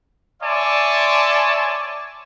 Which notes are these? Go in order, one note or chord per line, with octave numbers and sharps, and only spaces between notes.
C#5 D5 E5 G#5 A5 C6